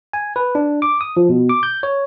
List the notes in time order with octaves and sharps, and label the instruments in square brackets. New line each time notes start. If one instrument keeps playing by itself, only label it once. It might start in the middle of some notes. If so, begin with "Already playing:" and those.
[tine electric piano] G#5
B4
D4
D6
D#6
F3
B2
D6
G6
C#5